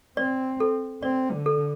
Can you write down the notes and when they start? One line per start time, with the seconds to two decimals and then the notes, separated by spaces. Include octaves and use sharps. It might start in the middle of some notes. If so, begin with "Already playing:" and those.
0.17 C4 D5
0.60 A4
1.03 C4 D5
1.31 D3
1.46 A4